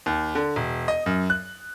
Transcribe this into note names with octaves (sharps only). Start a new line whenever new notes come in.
D#2
D3
E1
D#5
F#2
F#6